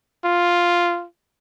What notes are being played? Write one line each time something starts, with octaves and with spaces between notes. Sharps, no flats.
F4